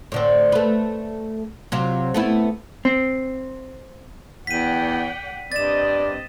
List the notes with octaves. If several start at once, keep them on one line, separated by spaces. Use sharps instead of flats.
A2 D3 C4
A3 B4
C3 F#3 F4
A3 B3 E4
C4
E2 D5 F#5 G5 B6 D#7
G2 C4 D5 D#5 A6 E7